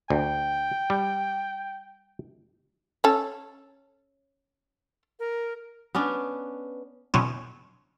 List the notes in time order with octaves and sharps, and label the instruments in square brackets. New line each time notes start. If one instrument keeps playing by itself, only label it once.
[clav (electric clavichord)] D2 [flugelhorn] G5
[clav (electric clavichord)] G3
[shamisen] C#4 A4
[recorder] A#4
[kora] B3 C#4 D4
[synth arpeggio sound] B2 D3 E3 F#3 C4 C#4